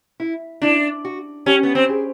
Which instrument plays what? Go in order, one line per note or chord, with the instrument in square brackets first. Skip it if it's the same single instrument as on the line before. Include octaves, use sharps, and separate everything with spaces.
[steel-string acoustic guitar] E4
[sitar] D4 [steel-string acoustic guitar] E4
[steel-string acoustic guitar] F#4
[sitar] C#4 [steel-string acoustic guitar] G4
[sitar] B3
C4
[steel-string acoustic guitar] G#4